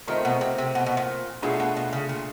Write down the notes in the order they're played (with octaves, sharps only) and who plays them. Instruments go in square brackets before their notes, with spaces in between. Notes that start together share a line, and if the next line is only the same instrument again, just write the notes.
[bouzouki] D#3 [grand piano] A3 C4 F4 A#4 D#5
[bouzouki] B2
C3
C3
B2
B2
A#2
[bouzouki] B2 [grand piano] A3 D4 F4 G#4
[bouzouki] B2
B2
C#3
A#2